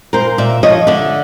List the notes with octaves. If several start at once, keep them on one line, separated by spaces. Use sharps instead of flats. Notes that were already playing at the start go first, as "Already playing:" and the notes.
A#2 A#4 C5
A#2 D5 E5
F3 C#5 D#5
D3 D5 E5